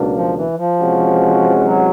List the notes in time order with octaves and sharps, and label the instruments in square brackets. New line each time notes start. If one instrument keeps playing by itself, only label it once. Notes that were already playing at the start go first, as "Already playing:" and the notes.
Already playing: [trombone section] C#2 B2 F#3 A#3 D4
[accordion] F3
E3
F3
[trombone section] C3 E3 G#3 C#4 F#4
[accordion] F#3